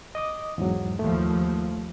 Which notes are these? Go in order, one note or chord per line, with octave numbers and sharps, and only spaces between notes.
D#5 D6 D#6
E2 G#2 F#3
D#2 F3 A3